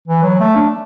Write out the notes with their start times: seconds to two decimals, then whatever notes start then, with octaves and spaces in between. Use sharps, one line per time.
0.08 E3
0.23 F#3
0.40 A3
0.55 D4